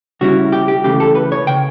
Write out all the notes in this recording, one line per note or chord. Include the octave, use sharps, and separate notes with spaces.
C#3 G3 C#4 E4 F#4
G4
G4
C#2 C#3 E3 A3 G4
A4
B4
C#5
C#3 G5